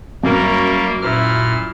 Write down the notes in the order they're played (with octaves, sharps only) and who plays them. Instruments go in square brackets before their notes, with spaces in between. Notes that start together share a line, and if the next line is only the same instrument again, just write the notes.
[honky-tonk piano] F#2 [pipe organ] G3 A#3 [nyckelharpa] A#4 C#5
[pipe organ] A#2 F6 [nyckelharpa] E4